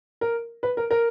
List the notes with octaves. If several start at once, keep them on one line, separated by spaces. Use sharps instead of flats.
A#4
B4
A#4
A#4